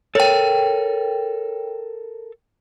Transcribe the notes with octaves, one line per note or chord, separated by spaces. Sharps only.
A4 A#4 C#5 G5